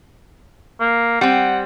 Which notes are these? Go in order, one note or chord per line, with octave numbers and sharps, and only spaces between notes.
A#3
G3 C4 F#5